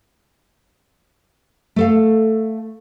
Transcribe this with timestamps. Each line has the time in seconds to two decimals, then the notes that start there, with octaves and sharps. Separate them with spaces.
1.76 A3 A4 F5